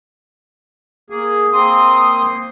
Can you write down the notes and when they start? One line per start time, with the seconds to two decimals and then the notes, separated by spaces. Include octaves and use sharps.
1.10 A#3 G#4
1.53 A#3 C4 C6 D#6